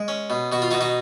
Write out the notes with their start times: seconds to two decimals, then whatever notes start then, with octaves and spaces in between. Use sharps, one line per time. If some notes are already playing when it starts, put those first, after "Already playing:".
Already playing: G#3
0.08 C#4
0.30 B2
0.52 B2 F#4
0.62 F4
0.71 D#4 F#4
0.74 B2
0.81 D#4 F#4